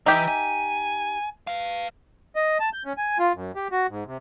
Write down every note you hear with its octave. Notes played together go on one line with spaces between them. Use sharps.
E3 D#4 G4 E5
G#5
B4 F5
D#5
A5
G6
C#4
G#5
F4
F#2
G4
F#4
G#2
C3